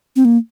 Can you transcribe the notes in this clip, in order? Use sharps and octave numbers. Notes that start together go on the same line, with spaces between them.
C4
A#3